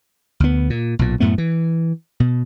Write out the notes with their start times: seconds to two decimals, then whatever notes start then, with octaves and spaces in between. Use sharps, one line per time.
0.40 D2 B3
0.70 A#2
0.99 B1 A#2
1.20 F#2 A2 A3 B3
1.38 E3
2.20 B2